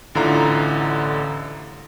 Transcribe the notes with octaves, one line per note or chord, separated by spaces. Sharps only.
A1 D3 E4 F4 A#5